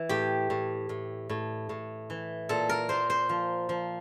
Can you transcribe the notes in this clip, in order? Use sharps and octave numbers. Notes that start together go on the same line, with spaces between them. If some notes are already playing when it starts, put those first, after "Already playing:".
Already playing: E3
A2 G4
A2
A2
A2
A2
E3
A#2 A4
A#4
A#2 C5
C5
F3
F3